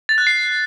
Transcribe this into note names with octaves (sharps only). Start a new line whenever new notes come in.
A6
F#6
C7